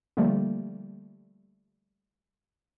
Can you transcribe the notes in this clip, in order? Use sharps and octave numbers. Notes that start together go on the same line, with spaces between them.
D3 F3 G3 A3 A#3